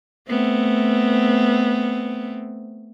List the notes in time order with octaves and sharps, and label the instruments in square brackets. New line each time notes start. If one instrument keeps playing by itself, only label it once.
[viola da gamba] A3 B3 C4